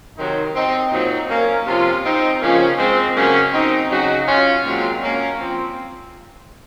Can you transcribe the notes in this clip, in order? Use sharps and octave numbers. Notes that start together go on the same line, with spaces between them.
C3 D#3 F#3 C4 D#4
C4 D#4
A#2 F#3 C4 D#4
A#3 C#4
C3 F3 C#4 F4
C4 D#4
C#3 F3 A#3 C#4
G#3 C4
C#3 F#3 A#3 C#4
C4 D#4
C#3 F#3 D#4 F#4
C#4 F4
A#2 F#3 G#3 C4
A#3 C#4
F3 C4